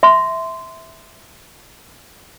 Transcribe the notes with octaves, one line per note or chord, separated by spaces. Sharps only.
E5 C6